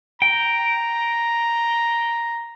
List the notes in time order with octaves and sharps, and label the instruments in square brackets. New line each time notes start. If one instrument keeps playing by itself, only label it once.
[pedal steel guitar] G5 [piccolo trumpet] A#5